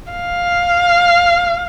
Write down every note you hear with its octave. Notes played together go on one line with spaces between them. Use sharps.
F5